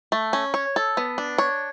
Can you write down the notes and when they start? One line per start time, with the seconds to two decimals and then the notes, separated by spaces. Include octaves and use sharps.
0.12 A3
0.33 C#4
0.54 C#5
0.76 A4
0.97 B3
1.18 D4
1.38 C#5